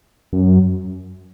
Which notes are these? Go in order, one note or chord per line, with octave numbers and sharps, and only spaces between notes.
F#2